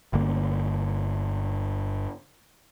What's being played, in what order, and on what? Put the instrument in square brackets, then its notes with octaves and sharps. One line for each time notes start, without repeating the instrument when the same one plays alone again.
[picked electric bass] G1 G2 D3 A#3